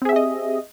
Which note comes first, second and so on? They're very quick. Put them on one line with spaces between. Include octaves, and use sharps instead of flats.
C4 G#4 E5 G4 D#5